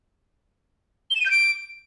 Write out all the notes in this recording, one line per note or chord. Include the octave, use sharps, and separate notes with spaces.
G7
E7
D#7
G6
D7